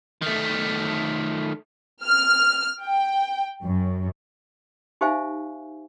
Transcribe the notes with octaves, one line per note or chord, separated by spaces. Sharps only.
D#3 A3
F6
G5
F#2
D#4 G4 C5 E5 F5 G#5